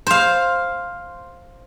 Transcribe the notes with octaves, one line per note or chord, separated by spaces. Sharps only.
C5 F5